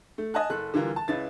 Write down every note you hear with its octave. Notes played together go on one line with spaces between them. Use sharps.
A3
D#5 G#5 A5 F#6
F#1 A4 F#6
D3 E3 G3 F4 A#4
A5
C#2 C#4 E4 B4 A6